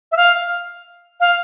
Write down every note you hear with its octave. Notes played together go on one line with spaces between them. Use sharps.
E5
F5
F5